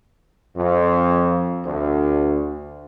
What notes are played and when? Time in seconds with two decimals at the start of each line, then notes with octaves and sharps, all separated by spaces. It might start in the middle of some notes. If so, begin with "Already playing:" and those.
0.56 F2
1.65 D2